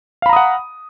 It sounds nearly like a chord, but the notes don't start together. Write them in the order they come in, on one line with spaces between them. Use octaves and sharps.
F5 B5 A#5 D#6 F#5